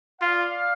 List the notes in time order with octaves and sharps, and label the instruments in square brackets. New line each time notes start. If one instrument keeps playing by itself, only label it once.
[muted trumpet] F4 [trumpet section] D5 F5